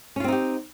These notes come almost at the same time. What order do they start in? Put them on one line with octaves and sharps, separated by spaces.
C#4 F4 C4 D#4 G4